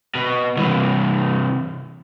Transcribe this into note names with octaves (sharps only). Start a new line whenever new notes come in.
B2
C2 E3